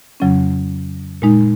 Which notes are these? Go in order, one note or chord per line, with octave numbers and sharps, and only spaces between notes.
F2 C#3 F#3 C#4
A#2 G#3 D#4